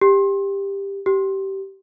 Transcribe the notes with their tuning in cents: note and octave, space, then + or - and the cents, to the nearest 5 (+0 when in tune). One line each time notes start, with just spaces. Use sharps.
G4 +15
G4 -20